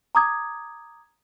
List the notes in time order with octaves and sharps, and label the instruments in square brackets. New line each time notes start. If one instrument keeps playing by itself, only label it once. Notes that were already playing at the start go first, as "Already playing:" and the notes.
[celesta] A#5 D6 D#6 G#6